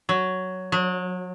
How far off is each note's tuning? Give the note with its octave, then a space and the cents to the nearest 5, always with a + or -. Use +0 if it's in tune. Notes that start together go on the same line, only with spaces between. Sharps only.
F#3 +5
F#3 -30